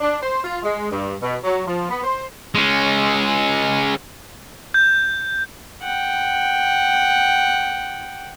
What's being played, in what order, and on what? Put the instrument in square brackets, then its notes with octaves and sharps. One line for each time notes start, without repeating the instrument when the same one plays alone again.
[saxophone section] D4
C5
F4
G#3
G2
B2
F#3
F3
B3
C5
[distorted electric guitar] G#3 C#4
[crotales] G6
[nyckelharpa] F#5 G5